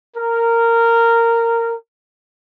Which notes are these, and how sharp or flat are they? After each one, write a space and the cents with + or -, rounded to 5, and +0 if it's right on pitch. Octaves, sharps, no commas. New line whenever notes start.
A#4 -15